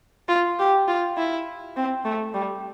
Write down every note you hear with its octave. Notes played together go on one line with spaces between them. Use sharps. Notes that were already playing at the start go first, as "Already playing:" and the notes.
F4
G4
F4
E4
C4
A3
G3